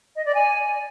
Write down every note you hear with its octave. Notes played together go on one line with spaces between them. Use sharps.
D#5
D5
G#5